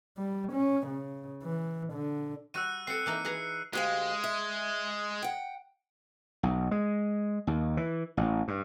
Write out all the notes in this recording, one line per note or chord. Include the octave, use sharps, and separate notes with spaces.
G3
C#4
C#3
E3
D3
G3 F#4 E6 F#6 D#7
C4 A4 C7 C#7
E3 A#3 D#4
G#4 B4 A#5
D2 G#3 G4 F5
E5
F#5 G5
B1
G#3
D#2
E3
A1
G2